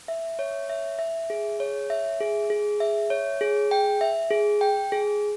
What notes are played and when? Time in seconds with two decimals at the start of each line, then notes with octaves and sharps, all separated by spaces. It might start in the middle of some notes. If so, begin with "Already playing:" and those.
0.08 E5
0.39 C#5
0.70 E5
0.99 E5
1.30 G#4
1.60 C#5
1.90 E5
2.20 G#4
2.50 G#4
2.80 E5
3.10 C#5
3.41 G#4
3.71 G5
4.01 E5
4.31 G#4
4.61 G5
4.92 G#4